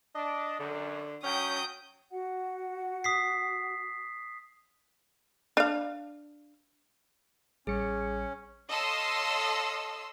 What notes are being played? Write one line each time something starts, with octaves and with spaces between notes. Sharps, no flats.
D4 D#5
F#2 D3
F#3 C#4 G5 D#6 G6
F#4 F#5
D#6 B6 C7
D4 F5
A1 G3 C#4 G#4 C#7
A4 C#5 D#5 F5 C6 E6